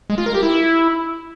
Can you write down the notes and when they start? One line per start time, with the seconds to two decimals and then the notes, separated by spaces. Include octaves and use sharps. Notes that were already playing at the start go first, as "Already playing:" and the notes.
0.10 G#3
0.18 F4
0.26 A#4
0.34 G4
0.43 E4